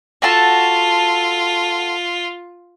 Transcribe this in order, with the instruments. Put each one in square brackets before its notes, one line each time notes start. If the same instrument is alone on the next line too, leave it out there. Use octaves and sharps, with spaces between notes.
[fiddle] F4 [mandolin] F#4 A4 A5